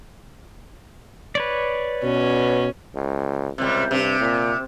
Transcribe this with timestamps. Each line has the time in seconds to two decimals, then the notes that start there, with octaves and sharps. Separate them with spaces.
1.35 B4 C#5 D5
2.03 B2 C#4
2.96 C#2
3.58 C#2 C3 G3
3.91 G2 C3
4.21 A#2